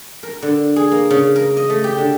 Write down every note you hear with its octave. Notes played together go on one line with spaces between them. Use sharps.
A#4
D3
G#4
A#3
C#3
A#4
D#5
A3
G4
D3